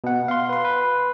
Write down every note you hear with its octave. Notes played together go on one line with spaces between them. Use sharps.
B2 F#5
F5 C6
B4 C6
B4